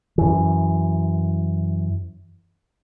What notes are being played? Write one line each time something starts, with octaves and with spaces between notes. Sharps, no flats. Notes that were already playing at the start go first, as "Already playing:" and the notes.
F#2 E3